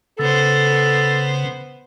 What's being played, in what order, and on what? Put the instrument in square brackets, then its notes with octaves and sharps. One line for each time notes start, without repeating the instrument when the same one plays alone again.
[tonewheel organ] C#3 [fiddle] B3 C5 [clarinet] A4